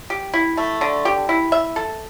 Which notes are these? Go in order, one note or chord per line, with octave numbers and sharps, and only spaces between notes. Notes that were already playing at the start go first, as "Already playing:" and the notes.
G4
E4
A3
D3
G4
E4
E5
A4